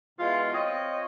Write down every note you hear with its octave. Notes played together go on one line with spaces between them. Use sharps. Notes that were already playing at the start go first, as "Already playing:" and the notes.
B2 E3 G#3 F4
C4 F4 C#5 D#5